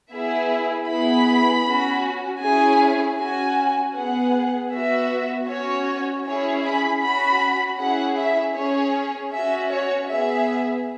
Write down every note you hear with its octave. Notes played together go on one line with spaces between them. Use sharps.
B3 E4 G#4 E5
B3 E4 G#4 B5
C#4 F#4
C#4 E4 G#4 G#5
C#4 F#4 G#5
B3 G#4 F#5
B3 F#4 E5
C#4 F#4 C#5
C#4 E4 G#4 C#5
B5
C#4 F#4 B5
C#4 E4 G#4 F#5
E5
C#4 G#4 C#5
C#4 F#4 E5
C#5
B3 G#4 E5